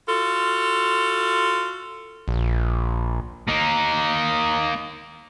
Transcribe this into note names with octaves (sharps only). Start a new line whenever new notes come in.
F4 F#4 A4
A#1
A#3 D#4